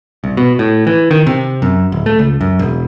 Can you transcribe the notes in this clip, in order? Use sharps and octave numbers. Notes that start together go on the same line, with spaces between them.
C2
B2
A2
E3
D#3
C3
F#2
D1
A3
C#2
F#2
E1